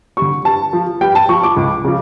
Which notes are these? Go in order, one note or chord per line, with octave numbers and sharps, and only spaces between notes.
D3 G3 C#6
G2 A5
F3
G2 G5
A5
F3 C#6
D6
C#2
C#3 F3